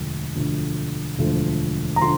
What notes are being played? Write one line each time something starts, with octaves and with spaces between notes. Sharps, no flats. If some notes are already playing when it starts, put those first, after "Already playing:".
Already playing: E1 D2 D3 F3 A3
E1 D2 D3 F3 A3
E1 D2 D3 F3 A3
A#5
D3 F3 C6